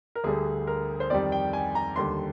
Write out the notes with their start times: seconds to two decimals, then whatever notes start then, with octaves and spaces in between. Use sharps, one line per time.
0.15 A#4
0.24 D2 D3 G3 G#4
0.67 A#4
1.00 C5
1.10 F2 D#3 G3 D5
1.32 G5
1.53 G#5
1.75 A#5
1.96 D#2 D3 G3 C6